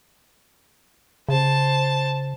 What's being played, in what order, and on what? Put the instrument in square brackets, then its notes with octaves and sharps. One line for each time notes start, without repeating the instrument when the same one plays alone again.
[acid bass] C#3 [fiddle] C5 A5